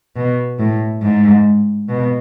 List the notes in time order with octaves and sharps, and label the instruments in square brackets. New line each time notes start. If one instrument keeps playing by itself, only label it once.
[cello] B2
A2
G#2
B2